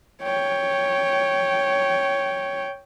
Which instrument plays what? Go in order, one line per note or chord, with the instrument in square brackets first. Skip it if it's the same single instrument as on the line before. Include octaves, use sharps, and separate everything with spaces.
[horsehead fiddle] C#5 G5